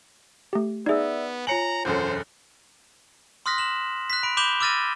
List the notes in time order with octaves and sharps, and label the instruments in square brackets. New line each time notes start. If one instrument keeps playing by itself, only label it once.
[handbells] A3 G4
[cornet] B3 [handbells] D#4 G#4 [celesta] D5 E5 E6
[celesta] F4 C#5 G#5 [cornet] A#5 [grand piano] C#7 F#7
[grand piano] E1 F#2 A4 [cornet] C5
[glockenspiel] C6 D#6 F6 F#6 A#6 B6
E7 F#7
F#6 B6
B5 D7
B5 D6 G6 E7 G7
D6 E6 F6 A6 A#6 D#7